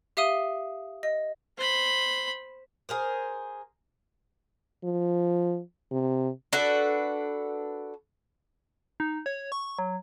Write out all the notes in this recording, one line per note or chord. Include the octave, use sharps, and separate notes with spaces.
G4 E5 F5 D#6 D#7 G7
D#5
C5 B5
G#4 A#4 C5
F3
C3
D4 F#4 A4 B4
D#4
C#5
C#6
F#3